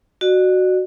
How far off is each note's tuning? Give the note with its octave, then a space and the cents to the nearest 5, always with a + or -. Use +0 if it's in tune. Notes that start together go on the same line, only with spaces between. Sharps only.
F#4 +0 D5 +45